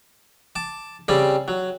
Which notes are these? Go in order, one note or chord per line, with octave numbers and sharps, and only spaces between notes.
A5 D6
C#3 G3 C4 D5
F#3